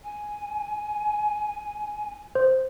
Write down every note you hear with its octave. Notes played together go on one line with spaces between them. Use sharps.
G#5
C5